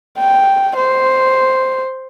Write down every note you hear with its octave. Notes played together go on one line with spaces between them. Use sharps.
G5
C5